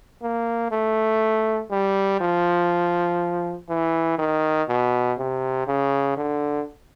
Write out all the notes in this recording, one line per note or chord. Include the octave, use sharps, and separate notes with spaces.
A#3
A3
G3
F3
E3
D#3
B2
C3
C#3
D3